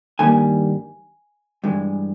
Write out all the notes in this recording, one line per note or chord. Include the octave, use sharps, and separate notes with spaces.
G2 D#3 G3 A#3 G#5
G2 E3 G#3